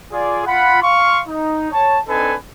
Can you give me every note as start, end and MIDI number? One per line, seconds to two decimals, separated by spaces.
0.12 0.42 65
0.12 0.42 68
0.12 0.42 74
0.46 0.81 65
0.46 0.81 78
0.46 0.81 83
0.83 1.21 77
0.83 1.21 84
0.83 1.21 85
1.28 1.71 63
1.72 1.99 73
1.72 1.99 81
2.08 2.35 60
2.08 2.35 62
2.08 2.35 63
2.08 2.35 69
2.08 2.35 71
2.08 2.35 80